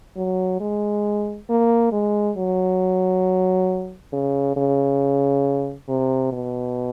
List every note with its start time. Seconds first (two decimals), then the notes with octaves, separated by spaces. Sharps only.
0.16 F#3
0.60 G#3
1.49 A#3
1.92 G#3
2.37 F#3
4.13 C#3
4.56 C#3
5.89 C3
6.33 B2